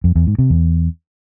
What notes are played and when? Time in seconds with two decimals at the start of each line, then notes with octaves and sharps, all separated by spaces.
0.04 F2
0.15 E2
0.27 G#2
0.39 C3
0.50 E2